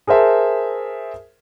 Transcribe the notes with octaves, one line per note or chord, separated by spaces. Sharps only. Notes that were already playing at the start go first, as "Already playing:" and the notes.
G#4 A#4 C5 E5 A5